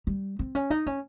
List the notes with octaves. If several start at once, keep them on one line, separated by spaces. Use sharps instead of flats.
G3
C4
C#4
D#4
C#4